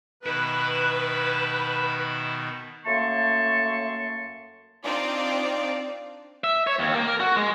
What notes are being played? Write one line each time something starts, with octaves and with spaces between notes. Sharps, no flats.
B2 D#3 E4 B4
F#2 A3 A#3 A5 C6 C#6
C4 D4 D#4 F4 D5
E5
C#5
D#2
A#3
A#4
F#4
G#3